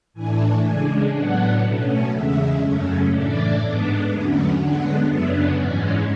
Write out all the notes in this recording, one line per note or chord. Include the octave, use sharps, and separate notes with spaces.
A2 E3 A3 D4 G#5
C#3 G#3 D4 G#5
A2 F#3 B3 D4 F#5
B2 A3 C#4
E2 C#3 G#3 E5
F#2 C#3 F#3 A3 C#4
A2 E3 A3 D4 D5
G#2 G#3 B3 D4
E2 D3 F#3 A3 C#4
D3 G#3 B3 D4 F#5
F#2 C#3 F#3 B3 D4 E5
G#2 E3 G#3 C#4 D5